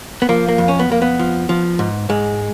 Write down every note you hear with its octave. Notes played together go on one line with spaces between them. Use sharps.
B3
F3 A#3
A#3
F2
C#4
B3
F2 A#3
B3
F3
F3
G#2
G#2 G#3